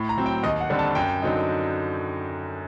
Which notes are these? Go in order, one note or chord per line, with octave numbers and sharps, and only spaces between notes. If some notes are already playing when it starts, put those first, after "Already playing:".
Already playing: A2
A#5
F#3 C4
G5
D#2 D#5
F#5
D3 G3 C4
A5
F#2 G5
D3 F#3 C4 D#4